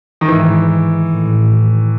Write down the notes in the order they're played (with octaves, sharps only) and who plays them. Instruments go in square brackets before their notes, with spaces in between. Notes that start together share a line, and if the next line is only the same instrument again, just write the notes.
[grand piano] D#3
[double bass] G#2 [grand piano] E3
[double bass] A2